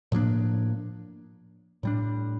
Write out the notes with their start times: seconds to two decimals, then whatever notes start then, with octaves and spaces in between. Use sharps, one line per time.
0.12 A2 F3 A#3 D4
1.83 A2 G3 D4